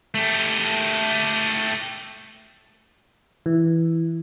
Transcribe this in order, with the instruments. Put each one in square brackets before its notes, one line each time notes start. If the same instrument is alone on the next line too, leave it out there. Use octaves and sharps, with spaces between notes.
[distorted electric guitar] A3 G4
[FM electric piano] E3